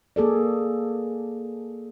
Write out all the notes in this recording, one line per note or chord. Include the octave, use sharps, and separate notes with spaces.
A#3 G#4 A4 D5